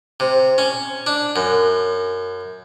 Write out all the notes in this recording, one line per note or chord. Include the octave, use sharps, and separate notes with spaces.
C3
C#4
D4
F#2